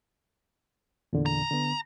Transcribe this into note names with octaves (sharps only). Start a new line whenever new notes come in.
E2 A#2 D3
A#5
D3 B3